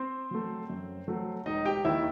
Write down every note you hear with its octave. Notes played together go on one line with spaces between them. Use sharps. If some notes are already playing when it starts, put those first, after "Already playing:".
Already playing: C4 C5
F#3 A3
F#2
F#3 A3
E1 D#4 D#5
G4 G5
D#2 D#3 E4 E5